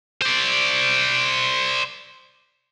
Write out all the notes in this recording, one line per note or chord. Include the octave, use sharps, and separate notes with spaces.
C5 D5